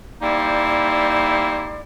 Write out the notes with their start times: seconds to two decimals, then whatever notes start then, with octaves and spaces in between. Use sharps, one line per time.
0.21 G3 A#3 D#4 E4 C5 D5